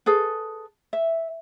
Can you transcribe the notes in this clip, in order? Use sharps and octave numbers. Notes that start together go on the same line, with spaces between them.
G#4 A4 B4
E5